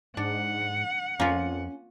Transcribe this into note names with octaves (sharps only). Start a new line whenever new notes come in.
G#2 D4 F#5
F2 A#3 C#4 F4